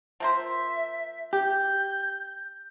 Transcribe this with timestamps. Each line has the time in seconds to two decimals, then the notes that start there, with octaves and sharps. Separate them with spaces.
0.20 F3 A#3 C5 E5
1.33 G4 G6